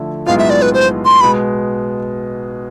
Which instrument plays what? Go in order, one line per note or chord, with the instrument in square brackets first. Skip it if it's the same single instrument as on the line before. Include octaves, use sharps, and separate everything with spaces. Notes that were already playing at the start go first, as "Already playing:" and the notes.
Already playing: [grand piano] D3 F3 A3 E4
[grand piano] B1 A2 G#3 B3 F4 [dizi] F5
[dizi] E5
D5
B4
C5
C6
[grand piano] B2 G#3 B3 [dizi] B5